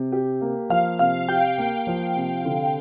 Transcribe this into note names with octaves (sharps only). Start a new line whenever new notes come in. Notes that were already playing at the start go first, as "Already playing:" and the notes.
Already playing: C3
G4
A#3
F3 F5
C3 F5
G4 G5
A#3
F3
C3
D3